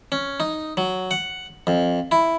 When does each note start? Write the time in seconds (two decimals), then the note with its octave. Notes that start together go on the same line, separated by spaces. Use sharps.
0.12 C#4
0.40 D#4
0.77 F#3
1.11 F#5
1.67 F2
2.11 E4